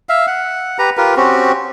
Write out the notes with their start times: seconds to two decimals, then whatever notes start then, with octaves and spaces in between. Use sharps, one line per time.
0.09 E5 F5
0.27 F#5
0.79 G4 B4 A#5
0.97 F4 G4 A#4 B4
1.16 C4 C#4 F#4 G4